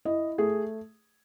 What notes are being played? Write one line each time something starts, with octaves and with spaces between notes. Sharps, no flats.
E4 D#5
A3 G#4